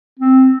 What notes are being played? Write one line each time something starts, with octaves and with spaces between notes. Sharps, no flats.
C4